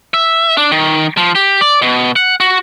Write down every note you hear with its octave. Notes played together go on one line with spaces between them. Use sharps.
E5
D4
D#3
F3
G4
D5
B2
F#5
F#4